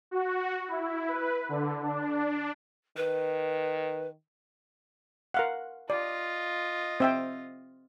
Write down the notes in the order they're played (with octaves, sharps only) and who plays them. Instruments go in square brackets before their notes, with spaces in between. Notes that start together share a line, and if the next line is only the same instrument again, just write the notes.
[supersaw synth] F#4
E4
B4
D3
D4
[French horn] D#3 [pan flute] B4
[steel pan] A#4 F5 F#5
[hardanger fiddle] F4 D#5 [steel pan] D5
[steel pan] C4 E5 G5